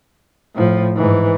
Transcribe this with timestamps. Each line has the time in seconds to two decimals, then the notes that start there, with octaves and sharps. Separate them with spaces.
0.55 A2 F3
0.96 G#2 E3